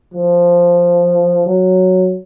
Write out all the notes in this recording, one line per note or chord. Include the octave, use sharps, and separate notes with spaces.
F3
F#3